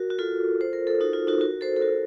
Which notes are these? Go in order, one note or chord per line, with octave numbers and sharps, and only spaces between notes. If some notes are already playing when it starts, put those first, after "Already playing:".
Already playing: F#4 A#4
F#4
F4 A4
C5
A#4
A4
D#4 F#4
F4
D#4 F#4
F#4 A#4
A4 C5
A4
F#4 A#4